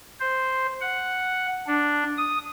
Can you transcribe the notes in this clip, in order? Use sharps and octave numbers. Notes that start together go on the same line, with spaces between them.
C5
F#5
D4
D#6